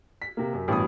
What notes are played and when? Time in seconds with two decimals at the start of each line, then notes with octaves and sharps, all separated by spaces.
0.22 B6
0.37 C3 A#3
0.53 F#2
0.68 A1 G2 B2 B5 D#6